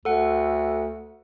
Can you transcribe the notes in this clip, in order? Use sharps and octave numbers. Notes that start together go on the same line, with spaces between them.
D2 A4 F#5